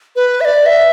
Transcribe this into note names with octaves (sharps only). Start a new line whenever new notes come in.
B4
E5
D5
E5